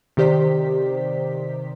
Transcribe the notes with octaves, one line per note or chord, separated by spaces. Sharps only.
C3 D#3 G4 C5 D5 B6